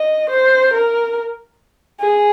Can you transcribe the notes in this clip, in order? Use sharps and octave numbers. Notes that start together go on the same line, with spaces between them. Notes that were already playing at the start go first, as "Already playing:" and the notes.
Already playing: D#5
C5
A#4
G#4